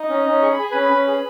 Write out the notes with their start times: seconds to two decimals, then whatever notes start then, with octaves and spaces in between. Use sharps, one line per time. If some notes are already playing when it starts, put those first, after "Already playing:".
Already playing: D#4 D#5
0.09 C#4
0.26 C#4
0.42 G#4 C#6
0.53 B5
0.59 G#4 G#5
0.71 C#4 B4 B5
0.91 C#4
1.08 G#4